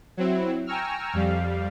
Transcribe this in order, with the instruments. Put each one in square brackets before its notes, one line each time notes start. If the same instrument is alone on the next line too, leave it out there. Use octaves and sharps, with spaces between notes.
[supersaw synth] F#3 C4 E4
G5 G#5 A#5 C#6 E6 F6
F2 G3 F5